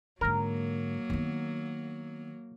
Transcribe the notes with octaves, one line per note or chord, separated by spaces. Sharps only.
G#2 D3 F#3 A#3 A#4
D#3 B3